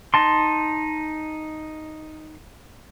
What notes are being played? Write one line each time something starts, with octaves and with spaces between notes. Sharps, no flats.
D#4 A5 C6